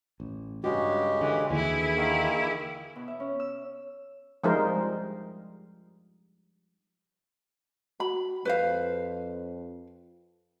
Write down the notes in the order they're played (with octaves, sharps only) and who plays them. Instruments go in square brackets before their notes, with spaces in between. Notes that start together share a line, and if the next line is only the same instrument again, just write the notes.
[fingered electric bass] A1
[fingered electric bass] G2 [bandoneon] C#3 G#3 G4 [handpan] F#4
[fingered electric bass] D3 [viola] E3
[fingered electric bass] D#2 [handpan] D3 E3 [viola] E4 G#4
[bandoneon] D#3 A#3
[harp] B2
E5
C#4
E6
[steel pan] F3 G3 G#3 D#4 A#4 C5
[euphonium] F#4 [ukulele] B5
[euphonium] F2 [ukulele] B4 C5 F5